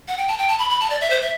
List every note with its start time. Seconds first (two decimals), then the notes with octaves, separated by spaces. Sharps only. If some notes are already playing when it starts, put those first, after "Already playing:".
0.08 F#5
0.18 G5
0.28 A5
0.38 G5
0.48 A5
0.59 B5
0.70 B5
0.80 A5
0.90 D5
1.01 E5
1.10 C5
1.22 E5